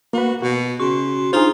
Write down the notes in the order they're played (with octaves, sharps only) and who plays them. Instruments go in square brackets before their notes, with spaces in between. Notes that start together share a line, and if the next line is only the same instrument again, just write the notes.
[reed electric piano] A#3 B4 [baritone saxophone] F#4
[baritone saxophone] B2 [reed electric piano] F#4
[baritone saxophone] C#3 [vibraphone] F#4 C6 [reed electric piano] C#6
[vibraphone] D4 D#4 A#5 [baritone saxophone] F4 [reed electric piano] G#4 C5